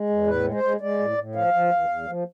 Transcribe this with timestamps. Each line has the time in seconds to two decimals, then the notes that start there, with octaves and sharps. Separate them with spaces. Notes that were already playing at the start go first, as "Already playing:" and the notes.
Already playing: G#3
0.09 E2
0.27 A2 B4
0.45 G#3
0.54 C5
0.63 G#3
0.81 G#3 D5
0.99 A2
1.18 A2
1.35 F3 F5
1.54 F3
1.72 E2
1.89 E2
2.07 F3